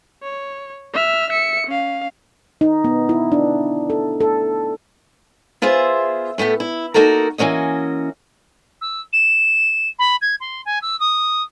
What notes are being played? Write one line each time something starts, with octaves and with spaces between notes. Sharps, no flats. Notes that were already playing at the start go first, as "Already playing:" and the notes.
C#5
E5 F6
E5 C#7
C#4 F5
D#4
B3
E4
D4
A4
A4
B3 F4 G#4 C5 E5
A2 A3 B3 G4
E4
A#3 D#4 F#4 A4 A#4
E3 A#3 C#4 F#4 D#5
E6
E7
B5
G#6
C6
G#5
E6
D#6